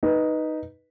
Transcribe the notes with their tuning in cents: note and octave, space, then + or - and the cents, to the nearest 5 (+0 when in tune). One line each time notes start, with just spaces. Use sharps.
D#4 +0 B4 -10